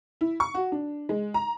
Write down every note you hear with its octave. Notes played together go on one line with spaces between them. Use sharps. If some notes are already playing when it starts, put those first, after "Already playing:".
E4
C#6
F#4
D4
G#3
A#5